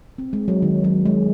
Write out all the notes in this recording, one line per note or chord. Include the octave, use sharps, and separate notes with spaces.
C4
G#3
F#3
D#3
F#3
G#3